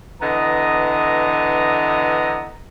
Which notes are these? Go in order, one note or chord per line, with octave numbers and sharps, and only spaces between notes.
D3 E3 B3 D#5 A#5